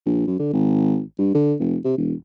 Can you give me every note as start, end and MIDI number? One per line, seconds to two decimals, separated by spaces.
0.06 0.24 34
0.27 0.37 42
0.39 0.50 50
0.53 1.02 32
1.19 1.31 43
1.34 1.54 50
1.60 1.77 29
1.85 1.93 48
1.98 2.14 28